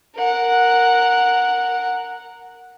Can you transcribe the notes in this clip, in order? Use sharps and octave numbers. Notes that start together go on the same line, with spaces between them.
A#4 F#5